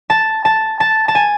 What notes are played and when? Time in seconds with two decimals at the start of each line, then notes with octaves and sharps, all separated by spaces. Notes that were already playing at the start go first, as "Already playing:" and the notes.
0.10 A5
0.45 A5
0.80 A5
1.08 A5
1.15 G#5